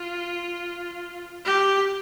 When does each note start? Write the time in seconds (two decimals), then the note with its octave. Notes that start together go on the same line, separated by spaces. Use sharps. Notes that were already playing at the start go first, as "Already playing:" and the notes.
Already playing: F4
1.45 G4